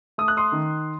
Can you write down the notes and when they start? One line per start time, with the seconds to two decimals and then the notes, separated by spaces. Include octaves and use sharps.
0.18 A3 D#6
0.28 F#6
0.37 C6 D#6
0.52 D#3